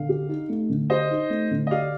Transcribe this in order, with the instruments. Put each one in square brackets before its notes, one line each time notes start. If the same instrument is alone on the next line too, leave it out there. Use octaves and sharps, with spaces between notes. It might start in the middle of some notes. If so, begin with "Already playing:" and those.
Already playing: [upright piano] D3 [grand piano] F5
[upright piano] G4
D#4
A3
D3
[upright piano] G4 [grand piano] C5 D#5
[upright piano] D#4
A3
D3
[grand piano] D#5
[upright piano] G4 [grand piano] D5 F5